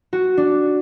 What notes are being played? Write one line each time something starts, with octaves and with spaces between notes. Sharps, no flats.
F#4
D4